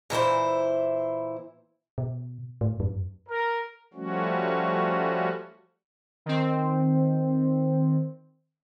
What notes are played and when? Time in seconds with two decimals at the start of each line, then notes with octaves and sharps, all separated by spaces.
0.10 A#2 E3 E4 C5
1.98 B2
2.61 A2
2.80 F#2
3.29 A#4
3.94 F3 G3 A3 C#4 F#4
6.26 D#3 C4